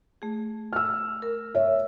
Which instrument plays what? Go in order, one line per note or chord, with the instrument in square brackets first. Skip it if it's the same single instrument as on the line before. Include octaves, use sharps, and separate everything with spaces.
[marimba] A3 G#4
[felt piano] E6 F6
[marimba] A#4
[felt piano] C#5 E5